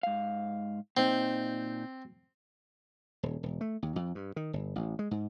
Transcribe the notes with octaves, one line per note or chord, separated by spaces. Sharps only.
G#2 F5
A#2 C4 D#4
D#1
E1
A3
D#2
F2
G2
D#3
G1
A1
G#3
G#2